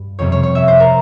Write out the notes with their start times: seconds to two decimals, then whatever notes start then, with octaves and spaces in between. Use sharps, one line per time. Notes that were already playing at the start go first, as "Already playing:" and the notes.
Already playing: G2
0.19 F2 C3 G3 C4 C#5
0.32 C#5
0.43 C#5
0.55 E5
0.68 C5
0.80 A#4